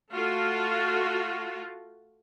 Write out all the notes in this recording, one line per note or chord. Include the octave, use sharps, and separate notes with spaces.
A3 F4 F#4